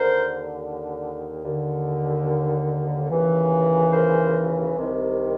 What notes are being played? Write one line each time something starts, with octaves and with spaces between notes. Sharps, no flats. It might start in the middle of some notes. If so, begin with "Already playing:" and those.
Already playing: D#2 D3 A#4 C5
D#2 D3
D#2 C#3 E3
A#4 C5
C2 C3 D#3